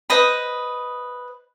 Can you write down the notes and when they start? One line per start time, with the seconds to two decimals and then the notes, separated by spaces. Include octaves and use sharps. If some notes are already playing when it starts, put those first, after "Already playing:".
0.10 B4 C5 D#5 B5